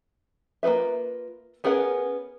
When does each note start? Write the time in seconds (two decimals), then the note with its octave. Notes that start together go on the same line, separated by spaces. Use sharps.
0.63 A#3 F4 A4 B4 E5
1.64 B3 C#4 G#4 A#4 F#5